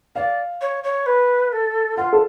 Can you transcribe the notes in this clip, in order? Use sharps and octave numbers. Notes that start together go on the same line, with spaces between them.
D5 F5
C#5
C#5
B4
A4
F4 F#5
A4